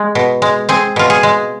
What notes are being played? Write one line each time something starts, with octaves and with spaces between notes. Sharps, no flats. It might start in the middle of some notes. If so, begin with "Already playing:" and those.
Already playing: G#3
B2
G#3
C4 G#4
B2 F4
G#4
G#3